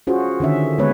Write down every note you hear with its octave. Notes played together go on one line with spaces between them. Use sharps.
C#4 F4 F#4 G#4 C5
D3 D#3 C#4 E5
D3 G#3 A#3 B3 B4 C#5